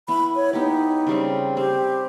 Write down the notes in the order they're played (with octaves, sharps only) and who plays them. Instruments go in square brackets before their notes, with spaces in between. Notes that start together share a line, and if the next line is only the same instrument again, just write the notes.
[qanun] B3 E4 [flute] B5
[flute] C#5
[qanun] B3 G4 [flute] D#4
[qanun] C#3 G3 C4
[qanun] C4 [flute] G4